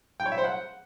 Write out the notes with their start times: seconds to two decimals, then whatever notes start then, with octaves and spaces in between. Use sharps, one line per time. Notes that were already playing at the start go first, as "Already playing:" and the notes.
0.20 G5
0.26 C#5
0.32 E5
0.38 C5
0.44 F#5